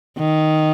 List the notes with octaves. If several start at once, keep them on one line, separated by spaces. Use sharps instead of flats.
D#3